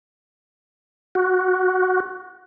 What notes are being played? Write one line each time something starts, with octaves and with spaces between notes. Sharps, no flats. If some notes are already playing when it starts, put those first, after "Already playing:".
F#4